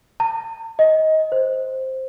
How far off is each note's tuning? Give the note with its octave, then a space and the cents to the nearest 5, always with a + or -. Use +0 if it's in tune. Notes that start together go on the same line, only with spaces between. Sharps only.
A5 +45
D#5 +20
C5 +5